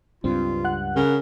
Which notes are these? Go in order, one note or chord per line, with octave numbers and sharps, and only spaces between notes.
C#2 G2 C4 F4
F#5 F#6
C#3 A#4